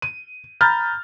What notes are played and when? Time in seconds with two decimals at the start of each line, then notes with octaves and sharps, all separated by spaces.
0.02 D#7
0.61 A#5 B5 F6 G6 A6